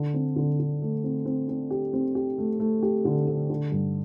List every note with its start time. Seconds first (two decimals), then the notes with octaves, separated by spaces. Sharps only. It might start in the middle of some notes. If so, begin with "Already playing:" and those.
Already playing: D3
0.14 C4
0.36 D3
0.59 D3
0.82 A3
1.03 C4
1.25 C4
1.49 C4
1.70 G4
1.93 C4
2.15 G4
2.38 A3
2.60 A3
2.83 G4
3.05 D3
3.27 D3
3.50 D3
3.72 G2